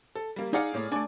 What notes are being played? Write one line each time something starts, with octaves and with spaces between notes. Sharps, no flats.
A4
G3 A#3
D#4 G#4 D5 F5 F#5
A2 A#3
A3 D4 G#5 D6